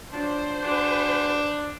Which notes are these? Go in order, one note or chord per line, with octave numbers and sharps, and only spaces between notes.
F3 F#3 D4 C5
D4 F#4 G#4 B4